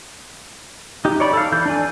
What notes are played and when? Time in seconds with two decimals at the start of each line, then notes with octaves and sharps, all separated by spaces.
1.05 D#4 G4
1.20 C#5 D5 B5
1.33 A4 F5
1.52 E3 G6
1.66 D4 D5 G#5